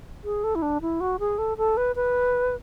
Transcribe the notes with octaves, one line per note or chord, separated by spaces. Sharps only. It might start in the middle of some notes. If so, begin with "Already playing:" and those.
G#4
A4
E4
D4
E4
F#4
G#4
A4
A4
B4
B4